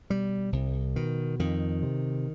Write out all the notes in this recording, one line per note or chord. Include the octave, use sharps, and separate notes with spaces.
B2 G3
C2
B2 D#3
F2 D#3
C3